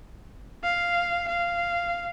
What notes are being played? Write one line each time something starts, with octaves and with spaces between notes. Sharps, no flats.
F5
F5